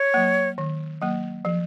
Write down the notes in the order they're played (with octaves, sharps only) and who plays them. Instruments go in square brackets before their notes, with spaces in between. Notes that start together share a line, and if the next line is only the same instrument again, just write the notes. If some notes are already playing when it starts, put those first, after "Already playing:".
Already playing: [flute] C#5
[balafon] F#3 A#3
D#3
F#3 A#3
F3